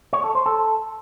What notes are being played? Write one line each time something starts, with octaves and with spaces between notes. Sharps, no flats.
C#5
A4
C5
A4